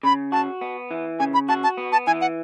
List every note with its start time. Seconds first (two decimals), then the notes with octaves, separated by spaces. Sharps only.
0.03 C#3 B5
0.32 F#4 A5
0.61 B3
0.91 E3
1.19 C#3 G#5
1.34 B5
1.49 F#4 A5
1.63 A5
1.77 B3
1.92 A5
2.07 E3 G#5
2.21 F#5